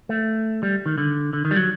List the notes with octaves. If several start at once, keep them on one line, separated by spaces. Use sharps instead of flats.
A3
G3
D#3
D3
D3
D#3
G3
F#3